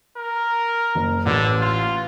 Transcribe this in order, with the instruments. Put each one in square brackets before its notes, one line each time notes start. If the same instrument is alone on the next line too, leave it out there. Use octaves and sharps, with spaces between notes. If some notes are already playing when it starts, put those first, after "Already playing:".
[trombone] A#4
[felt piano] F#1
[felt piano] A1 [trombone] D3
[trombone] F4